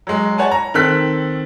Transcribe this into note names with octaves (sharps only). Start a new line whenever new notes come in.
F#3 G#3
C#5 F#5 G#5 A5
A#5
D#3 C4 A4 F#6 B6